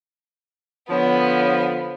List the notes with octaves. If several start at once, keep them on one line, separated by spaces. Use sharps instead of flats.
D3 F3 B3 C#5